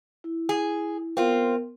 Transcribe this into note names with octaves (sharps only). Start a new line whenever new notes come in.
E4
G#4
B3 C4 F4 A#4